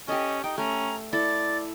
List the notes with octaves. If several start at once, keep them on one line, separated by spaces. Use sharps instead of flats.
C#4 G4 A4 D#5
D#4 G5
A3 C#4 A#5
E4 A4 D5 A6